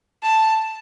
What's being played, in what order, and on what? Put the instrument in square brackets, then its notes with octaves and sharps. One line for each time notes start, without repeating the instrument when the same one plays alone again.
[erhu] A5